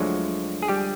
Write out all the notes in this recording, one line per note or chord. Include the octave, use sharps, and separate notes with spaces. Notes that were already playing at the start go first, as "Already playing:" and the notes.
Already playing: D2 D3 F3 F#3 G#3 F#4
G#4
G3 G4